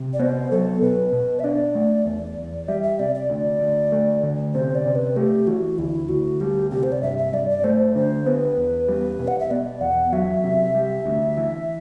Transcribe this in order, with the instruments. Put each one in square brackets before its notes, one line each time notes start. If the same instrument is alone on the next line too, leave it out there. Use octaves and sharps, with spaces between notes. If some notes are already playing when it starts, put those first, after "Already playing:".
Already playing: [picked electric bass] C3
[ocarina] D5
[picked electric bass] B3 [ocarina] C5
[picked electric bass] F#3 [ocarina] A4
[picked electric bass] B2 [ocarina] B4
[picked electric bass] B2
[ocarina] E5
[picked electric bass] D4 [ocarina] D5
[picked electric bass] A3
E2
E2
[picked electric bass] G3 [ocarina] E5
[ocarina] E5
[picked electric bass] C3 [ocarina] D5
[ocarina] D5
[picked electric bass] D2
D2
A3
D3
[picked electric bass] C3 [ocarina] C5
[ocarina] D5
[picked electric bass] C3
[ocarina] B4
[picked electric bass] A3 [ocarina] G4
[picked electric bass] E3 [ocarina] F#4
[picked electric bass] D2 [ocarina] E4
[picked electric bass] D2 [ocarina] F#4
[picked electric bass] G3 [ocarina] G4
[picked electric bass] C3 [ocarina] G4
[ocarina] C5
D5
[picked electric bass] G2 [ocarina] E5
[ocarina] E5
[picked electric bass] G2 [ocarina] D5
[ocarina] D5
[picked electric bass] A3 [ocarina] C5
[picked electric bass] D3 [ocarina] C5
[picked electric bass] B3 [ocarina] B4
[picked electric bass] E2
G3
B2
[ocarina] F#5
E5
[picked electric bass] B3 [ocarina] D5
[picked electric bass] E2 [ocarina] F#5
[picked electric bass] F#3 [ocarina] E5
[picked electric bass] C3
G3
D2
E3